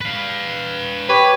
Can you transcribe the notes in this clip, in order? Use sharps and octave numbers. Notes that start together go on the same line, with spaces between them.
B4 F5
G4 B4 C#5